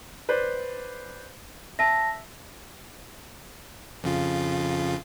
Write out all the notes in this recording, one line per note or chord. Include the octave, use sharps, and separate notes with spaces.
B4 C5 D5
E5 A5 A#6
F2 C#3 F4